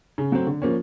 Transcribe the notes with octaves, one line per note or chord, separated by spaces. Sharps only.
C#3
F#3 A3 C4
D3
F3 A#3 C#4